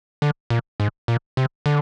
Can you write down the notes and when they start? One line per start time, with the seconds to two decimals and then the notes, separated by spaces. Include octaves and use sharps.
0.22 D3
0.50 A#2
0.80 G#2
1.08 A#2
1.37 C3
1.66 D3